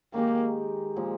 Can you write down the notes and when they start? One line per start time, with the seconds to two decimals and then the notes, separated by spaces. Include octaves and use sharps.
0.14 D#3 G#3 A#3 D#4 G4
0.96 A#2 F3 G#3